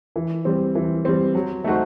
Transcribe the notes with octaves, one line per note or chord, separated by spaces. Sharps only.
E3
G3 C4
E3
G3 C4
F#3
A3 D#4 F#4 C5